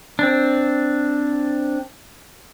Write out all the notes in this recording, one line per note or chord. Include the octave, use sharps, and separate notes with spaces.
C4 D4